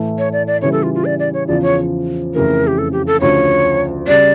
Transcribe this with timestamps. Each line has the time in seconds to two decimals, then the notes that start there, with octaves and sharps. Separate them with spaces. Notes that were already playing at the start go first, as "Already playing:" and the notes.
Already playing: A2 E3 A3
0.18 C#5
0.33 D5
0.47 D5
0.62 C#3 E3 G3 C#5
0.72 A4
0.83 F4
0.94 F4
1.05 D5
1.19 D5
1.34 C#5
1.48 E2 C#3 F3 D5
1.63 C#5
2.35 F2 C#3 E3 A3 A#4
2.67 G4
2.78 A4
2.92 G4
3.07 A4
3.21 D2 C#3 F3 C#5
4.07 C#3 G3 D5